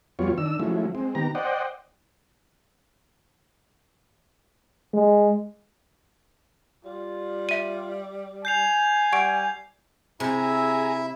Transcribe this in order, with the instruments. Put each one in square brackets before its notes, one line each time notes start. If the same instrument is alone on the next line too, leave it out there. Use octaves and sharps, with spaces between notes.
[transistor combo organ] F2 F#3 G3 B3 F4 C#5
D#3 D4 E6
F3 F#3 G#3 A3 C#4 E4
G#3 C4
D#3 B3 G4 A#5
C5 D5 D#5 F#5 G5
[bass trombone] G#3
[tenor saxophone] G3 [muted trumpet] F4
[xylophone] E5 D#7
[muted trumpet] G#5 [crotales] G6 C7 F7
[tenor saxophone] G3 [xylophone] F#5 C#6 D7
[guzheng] C3 [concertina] E4 E5 [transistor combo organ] G#4 G#5 A#5